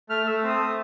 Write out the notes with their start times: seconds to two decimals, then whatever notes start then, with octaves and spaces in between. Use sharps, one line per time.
0.09 A3 F6
0.27 A3 E6
0.43 C4 D#6
0.59 A3